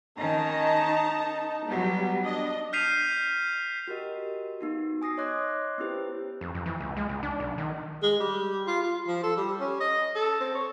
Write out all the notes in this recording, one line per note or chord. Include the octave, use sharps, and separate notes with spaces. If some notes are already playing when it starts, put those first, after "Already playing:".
D#3 C#4 D#4 A5 A#5
F#3 G3 B3
D4 D#5
F6 G6 B6 C7 D#7 F7
F#4 G4 A#4 D#5
B3 D#4 F#4
G#5 D#6 A#6 C7
C#5 D#5 C6 D6 F#6 G#6
B3 C#4 E4 G4 B4 C5
F2
F2
E3
C#2
G#3
C#2
D4
B1
D#3
G#3
G3
F4
F4
F3
A4
G3
C#4
D#5
A4
C4
C#5